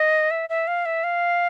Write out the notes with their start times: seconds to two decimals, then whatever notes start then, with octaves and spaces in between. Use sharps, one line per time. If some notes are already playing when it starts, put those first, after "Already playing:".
Already playing: D#5
0.31 E5
0.49 E5
0.67 F5
0.86 E5
1.04 F5